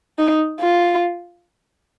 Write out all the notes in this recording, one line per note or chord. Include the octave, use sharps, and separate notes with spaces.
D#4
F4